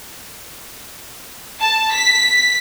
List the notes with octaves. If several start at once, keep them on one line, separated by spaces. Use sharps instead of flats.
A5
B6